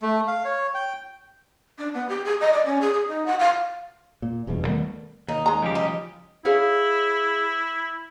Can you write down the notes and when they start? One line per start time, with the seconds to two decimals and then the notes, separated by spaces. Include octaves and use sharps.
0.02 A3
0.27 F5
0.45 C#5
0.74 G5
1.78 D4
1.94 B3
2.09 G4
2.25 G#4
2.41 D#5
2.53 D5
2.65 C#4
2.81 G#4
2.94 G#4
3.08 D#4
3.26 F#5
3.39 F5
4.22 A#2
4.47 E1 E2 G2 B2
4.66 D#3 G3 A3 B3
5.28 D#2 D#4
5.46 G#3 A#5
5.63 C#3 F3 G3 G4
5.75 D#4
6.45 E4 G#4 C#5 F5